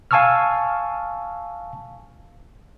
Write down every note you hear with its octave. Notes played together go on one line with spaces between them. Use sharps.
F5 G#5 A5 C#6 E6 F6